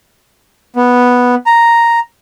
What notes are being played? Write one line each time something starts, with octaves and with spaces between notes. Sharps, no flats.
B3
A#5